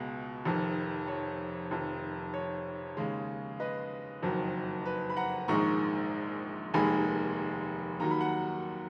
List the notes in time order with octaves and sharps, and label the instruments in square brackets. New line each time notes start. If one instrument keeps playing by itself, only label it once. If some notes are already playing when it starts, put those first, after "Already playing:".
Already playing: [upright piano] C#2 B2 G#3
F1 F2 D#3
C#5
F1 F2 D#3
C#5
D#2 C#3 G#3
B4 D#5
F#1 F2 D#3 F#3
B4
B5
F#5 A#5
A#1 G#2 D#3 G#3 A#5 C#6
F1 D#2 D#3 G#3 G#5 B5
D#2 D#3 F#3 A#5
B5
F#5 A#5